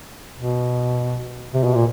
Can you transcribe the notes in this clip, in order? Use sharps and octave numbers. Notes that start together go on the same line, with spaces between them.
B2
C3
B2
A#2